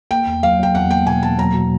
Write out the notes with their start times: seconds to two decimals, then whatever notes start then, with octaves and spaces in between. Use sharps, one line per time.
0.11 A#3 G5
0.27 E2
0.43 F#3 F5
0.59 F#3 G5
0.75 E2 F#5
0.90 A#3 G5
1.07 B2 G#5
1.23 E2 A5
1.38 F#3 A#5
1.54 B2